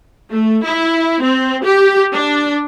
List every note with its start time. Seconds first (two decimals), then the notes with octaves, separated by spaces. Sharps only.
0.30 A3
0.64 E4
1.23 C4
1.65 G4
2.13 D4